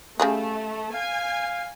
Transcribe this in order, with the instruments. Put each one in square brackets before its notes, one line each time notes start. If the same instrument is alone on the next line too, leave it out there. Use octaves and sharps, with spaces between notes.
[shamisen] C#3 G3 G#4 [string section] A3
[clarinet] F5 [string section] G#5